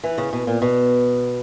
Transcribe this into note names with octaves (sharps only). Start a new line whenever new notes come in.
E3
C#3
B2
A#2
B2